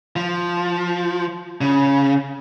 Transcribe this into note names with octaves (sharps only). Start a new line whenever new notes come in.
F3
C#3